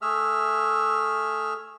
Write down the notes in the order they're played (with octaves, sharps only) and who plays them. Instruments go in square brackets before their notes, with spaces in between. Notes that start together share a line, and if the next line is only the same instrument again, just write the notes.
[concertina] A3 G#4 E5 E6 F6